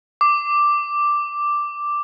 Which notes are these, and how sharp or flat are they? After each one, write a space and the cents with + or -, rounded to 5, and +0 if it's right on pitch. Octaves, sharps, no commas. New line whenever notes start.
D6 +0